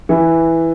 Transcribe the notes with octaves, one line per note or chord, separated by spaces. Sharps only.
E3